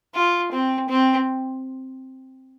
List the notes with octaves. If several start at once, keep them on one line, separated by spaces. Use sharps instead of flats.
F4
C4
C4